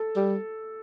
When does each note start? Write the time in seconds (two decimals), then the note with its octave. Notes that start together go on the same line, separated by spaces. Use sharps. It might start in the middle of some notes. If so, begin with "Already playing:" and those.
Already playing: A4
0.16 G3